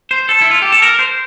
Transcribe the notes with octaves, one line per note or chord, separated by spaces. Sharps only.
C5
A4
E4
F4
G4
A4
A#4
C5